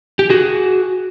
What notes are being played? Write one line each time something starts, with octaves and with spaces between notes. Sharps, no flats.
G4
F#4 G#4